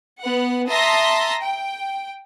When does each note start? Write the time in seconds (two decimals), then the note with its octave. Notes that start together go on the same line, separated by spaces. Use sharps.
0.20 B3 F#5
0.68 E5 A5 A#5 C6 D#6 A#6
1.40 G5